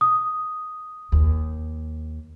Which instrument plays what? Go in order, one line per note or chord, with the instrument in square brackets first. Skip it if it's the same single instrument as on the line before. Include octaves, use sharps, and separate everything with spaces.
[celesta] D#6
[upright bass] D#2